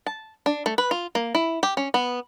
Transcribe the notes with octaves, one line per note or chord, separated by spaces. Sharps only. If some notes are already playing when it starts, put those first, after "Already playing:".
A5
D4
A3
B4
F4
A#3
E4
G4
C#4
B3